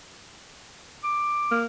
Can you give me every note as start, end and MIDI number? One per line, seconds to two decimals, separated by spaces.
1.04 1.57 86
1.51 1.66 58